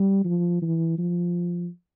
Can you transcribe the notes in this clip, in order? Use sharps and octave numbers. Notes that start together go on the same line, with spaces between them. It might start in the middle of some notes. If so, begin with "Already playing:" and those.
Already playing: G3
F3
E3
F3